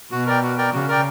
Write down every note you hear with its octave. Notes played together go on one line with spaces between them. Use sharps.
B2 F#4
A#4 D5 G5
F#4
A#4 D5 G5
C#3 F#4
A#4 D5 G5